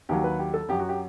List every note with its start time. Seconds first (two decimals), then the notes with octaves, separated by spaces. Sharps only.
0.09 D#2 D#3 F#3 G4
0.24 B4
0.39 G4
0.54 A4
0.68 F#2 F#3 G4
0.79 F#4
0.89 G4